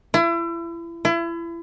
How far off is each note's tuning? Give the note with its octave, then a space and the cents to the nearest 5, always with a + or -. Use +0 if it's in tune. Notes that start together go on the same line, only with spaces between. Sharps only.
E4 +35
E4 +35